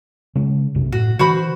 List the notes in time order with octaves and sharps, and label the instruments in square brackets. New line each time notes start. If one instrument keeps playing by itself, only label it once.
[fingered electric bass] C#3 G#3 C#4
B1 F#2 C3
[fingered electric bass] A2 [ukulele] F#4
[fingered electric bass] D3 E3 [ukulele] F#4 C5 B5